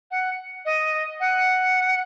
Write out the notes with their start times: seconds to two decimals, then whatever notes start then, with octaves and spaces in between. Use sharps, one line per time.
0.11 F#5
0.65 D#5
1.20 F#5